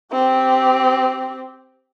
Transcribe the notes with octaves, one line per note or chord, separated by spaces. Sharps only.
C4 G4